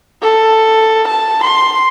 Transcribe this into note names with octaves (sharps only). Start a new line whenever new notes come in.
A4
A5
C6